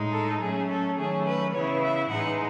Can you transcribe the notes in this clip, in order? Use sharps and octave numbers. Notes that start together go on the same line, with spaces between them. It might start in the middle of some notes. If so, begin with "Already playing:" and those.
Already playing: A2 G#3 D#4
A4
F#3 A3 C#4 G#4
A4
D#3 F#3 A3 C#4 G#4
B4
C#3 E3 B3 E4 C#5
E5
A2 E3 G#3 D#4 F#5